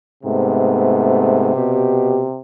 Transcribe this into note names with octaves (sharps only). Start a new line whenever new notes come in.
G#2 C3 A3 B3
B2 G4